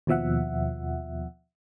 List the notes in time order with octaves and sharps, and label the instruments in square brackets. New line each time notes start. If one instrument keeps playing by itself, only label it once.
[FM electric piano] D#2 B2 F3 E5 F#5